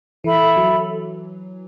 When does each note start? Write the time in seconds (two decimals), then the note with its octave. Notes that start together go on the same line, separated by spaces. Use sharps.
0.24 E3 A4 E5 B5
0.57 F#3